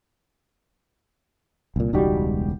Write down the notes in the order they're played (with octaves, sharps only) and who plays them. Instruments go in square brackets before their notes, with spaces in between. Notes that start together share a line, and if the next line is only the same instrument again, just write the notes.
[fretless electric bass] C2 A#2
[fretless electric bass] E1 C#2 G3 [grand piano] D#4 F#4 G4